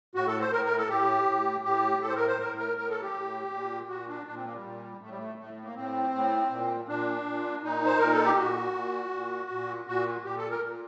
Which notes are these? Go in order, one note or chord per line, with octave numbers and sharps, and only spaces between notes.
A2 F#4
A4
C5
A2 A#4
A#4
A4
A2 G4
A2
A2 G4
A2 A4
C5
A#4
C5
A2 A#4
A#4
A2 A#4
A4
G4
A2
A#2
A#2 F#4
D4
A#2 D4
C4
A#3
G3
A#2
A2 A3
G3
A3
A2 A3
A#3
A2 C4
A2
A#2
A#2 D4
A#2
A#2 D#4
C5
A#2 A#4
A4
G4
A#2 F#4
A#2
A#2
A#2
A#2 F#4
A#2 G4
A4
A#4
A#2